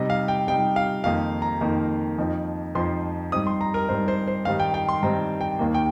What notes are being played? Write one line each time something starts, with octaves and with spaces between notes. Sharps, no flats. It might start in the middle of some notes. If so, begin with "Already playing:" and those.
Already playing: C3 G3 D#4 D#5
F5
G5
C3 G3 D#4 G5
F5
F2 D#3 A#3 D#4 F5
A#5
F2 D#3 A#3 D#4
F2 F3 D#4
F2 F3 D#4 C6
G2 G3 C4 D#4 D#6
C6
A#5
A#4
G2 G3 C4 D#4 C5
C5
C5
G2 D#3 G3 C4 D#4 F5
G5
G5
C6
G2 D#3 G3 C4 D#4 A#5
G5
D#2 D#3 A#3
G5